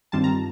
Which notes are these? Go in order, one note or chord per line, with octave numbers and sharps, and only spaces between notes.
G2 D#3 G3 C4 F4 A5
A#5